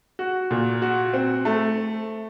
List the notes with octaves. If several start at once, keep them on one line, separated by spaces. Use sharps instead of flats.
F#4
A#2
F#4
C4
A3